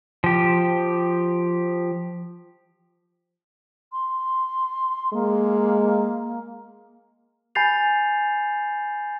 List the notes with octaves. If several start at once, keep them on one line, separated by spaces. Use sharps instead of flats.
F3 G4
C6
G#3 A#3
G#5 B5 G6 A6 C7 F7